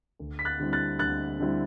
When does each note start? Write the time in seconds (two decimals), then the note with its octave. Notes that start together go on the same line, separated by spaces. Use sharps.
0.20 D2
0.39 B6
0.45 F#6 A6
0.60 D3 G3 C4 E4
0.73 F#6 A6
0.99 D2 F#6 A6
1.39 D3 G3 C4 E4